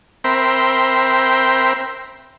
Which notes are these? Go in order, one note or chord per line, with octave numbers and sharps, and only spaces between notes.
C4 A#4 C5 E5 G5 B5